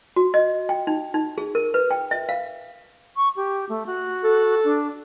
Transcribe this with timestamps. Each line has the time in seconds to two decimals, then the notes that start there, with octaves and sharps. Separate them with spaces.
0.16 F#4
0.34 D#5
0.69 G5
0.87 D#4
1.14 D#4
1.38 G#4
1.55 A#4
1.74 B4
1.91 G5
2.11 E5
2.29 F5
3.17 C#6
3.36 G4
3.69 A3
3.86 F#4
4.24 A4
4.64 D4